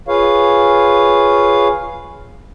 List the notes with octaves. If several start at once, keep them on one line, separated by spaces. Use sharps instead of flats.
F4 G#4 B4 C#5 F5